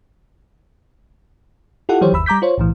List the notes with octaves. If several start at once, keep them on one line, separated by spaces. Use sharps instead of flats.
E4 F4 G4 A4 F#5
D#3 E3 F#3 G4 C5 C#5
G1 D#2 B5 E6
G3 A#5 D6 G6 B6
F4 C5 C#5
B1 A2 E3